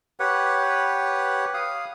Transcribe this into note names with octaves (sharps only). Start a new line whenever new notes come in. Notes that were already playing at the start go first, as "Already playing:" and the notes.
G4 B4 C#5 F#5
F5 D#6